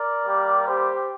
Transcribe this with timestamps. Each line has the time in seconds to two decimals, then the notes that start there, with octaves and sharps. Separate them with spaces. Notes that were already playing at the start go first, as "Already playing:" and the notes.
Already playing: A#4 D5
0.24 G3 A#3 G4
0.66 G4 C5